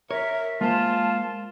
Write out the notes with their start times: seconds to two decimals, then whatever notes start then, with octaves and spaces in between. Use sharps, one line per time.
0.11 A#4 C#5 E5
0.61 G#3 A#3 F4 C5 A5